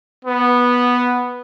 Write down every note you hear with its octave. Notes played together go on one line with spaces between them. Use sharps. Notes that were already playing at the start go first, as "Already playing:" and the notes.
B3